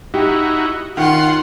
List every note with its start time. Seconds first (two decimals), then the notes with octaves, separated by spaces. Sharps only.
0.14 D#4 E4 F#4 G4
0.97 D#3 F4 F#5 C6